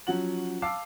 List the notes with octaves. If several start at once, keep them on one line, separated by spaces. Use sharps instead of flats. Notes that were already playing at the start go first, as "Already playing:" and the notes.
F3 F#3 C#4 F#4 F#5 F#7
F5 A5 D6 E6 C7